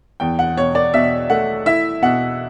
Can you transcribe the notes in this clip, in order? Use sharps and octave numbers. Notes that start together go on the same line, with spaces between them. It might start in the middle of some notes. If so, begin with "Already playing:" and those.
E2 G5
F#5
B2 C#5
D5
B2 E5
A3 F#5
E4 E5
B2 F#5